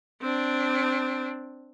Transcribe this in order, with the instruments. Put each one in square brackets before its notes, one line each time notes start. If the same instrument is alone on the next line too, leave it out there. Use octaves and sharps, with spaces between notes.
[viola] C4 D4